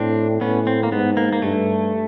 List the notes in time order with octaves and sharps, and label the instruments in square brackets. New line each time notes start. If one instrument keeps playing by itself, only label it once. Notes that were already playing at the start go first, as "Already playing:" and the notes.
Already playing: [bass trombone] A2 [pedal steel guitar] C4 D4
[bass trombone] A2 [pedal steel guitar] B3 C#4
[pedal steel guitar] C4
A#3
[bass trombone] G#2 [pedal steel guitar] B3
[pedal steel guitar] A#3
A#3
[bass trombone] G2 [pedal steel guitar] A3